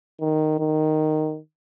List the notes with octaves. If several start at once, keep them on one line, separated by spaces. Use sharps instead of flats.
D#3
D#3